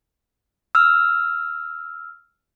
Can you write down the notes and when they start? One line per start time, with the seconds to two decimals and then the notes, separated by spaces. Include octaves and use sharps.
0.75 E6 F6